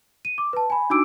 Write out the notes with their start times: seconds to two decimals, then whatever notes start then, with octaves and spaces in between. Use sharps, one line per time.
0.25 D#7
0.38 D6
0.53 B4 A5
0.70 G#5 B5
0.90 D4 D#4 F#4 D6 E6 D7